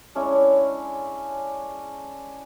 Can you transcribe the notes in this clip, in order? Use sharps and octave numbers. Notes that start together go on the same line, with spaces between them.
G#3 C#4 D4 E4